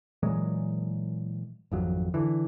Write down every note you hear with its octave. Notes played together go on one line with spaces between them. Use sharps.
A#2 E3 F#3 G#3
G#1 F2 F#3
D3 E3